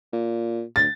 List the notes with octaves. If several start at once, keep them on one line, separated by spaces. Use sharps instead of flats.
A#2
D2 A6